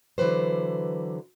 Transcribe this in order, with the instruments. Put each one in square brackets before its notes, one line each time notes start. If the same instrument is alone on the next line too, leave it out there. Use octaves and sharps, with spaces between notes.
[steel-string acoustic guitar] D3 E3 F#3 B4 C5